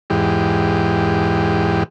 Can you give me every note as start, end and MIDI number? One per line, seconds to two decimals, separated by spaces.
0.10 1.83 40
0.10 1.83 44
0.10 1.83 67